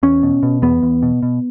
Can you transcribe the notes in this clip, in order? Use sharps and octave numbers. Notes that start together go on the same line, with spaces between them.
E2 C#4
B2
B2
E2 B3
E2
B2
B2